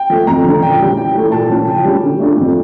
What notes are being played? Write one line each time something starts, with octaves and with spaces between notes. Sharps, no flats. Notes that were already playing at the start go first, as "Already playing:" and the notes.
Already playing: G5
F3 A3
F2 A#5
D3 F3
A#2 G5
G3 C#4
E3 G5
A3 E4
A#2 A5
F3 C#4 F4
C#3 G5
G3 C#4 F4
D3
A3 D4 F4
F2